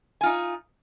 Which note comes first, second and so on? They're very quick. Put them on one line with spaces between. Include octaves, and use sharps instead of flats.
G#5 F4 D#4